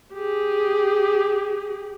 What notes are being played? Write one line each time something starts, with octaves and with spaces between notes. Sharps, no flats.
G4 G#4